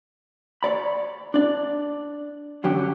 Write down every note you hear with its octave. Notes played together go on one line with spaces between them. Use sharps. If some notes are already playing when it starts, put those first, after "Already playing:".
C#5 D5 B5
D4 D5
F#2 D3 F#3 C#4 G4